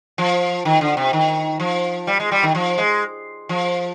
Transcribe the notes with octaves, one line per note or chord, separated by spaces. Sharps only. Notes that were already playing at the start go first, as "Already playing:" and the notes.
F3
D#3
D3
C3
D#3
F3
G3
G#3
G3
D#3
F3
G#3
F3